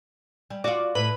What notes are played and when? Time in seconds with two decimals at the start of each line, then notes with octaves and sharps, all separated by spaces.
0.50 G3
0.64 F4 F#4 D5
0.95 A2 B4